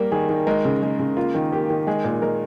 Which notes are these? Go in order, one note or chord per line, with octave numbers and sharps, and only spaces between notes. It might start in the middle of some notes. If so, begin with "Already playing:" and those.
Already playing: G3 A#3 A#4
D#3 G#4
D#3
G#3 A#4
C#3
G#3
C#3
A#3 F4
D#3
A#3 G4
D#3
G#3 G#4
A#2
G#3 A#4